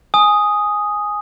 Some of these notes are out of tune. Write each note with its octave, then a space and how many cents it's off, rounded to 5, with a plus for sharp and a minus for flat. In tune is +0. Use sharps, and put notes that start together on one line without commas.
G#5 +0 D#6 +0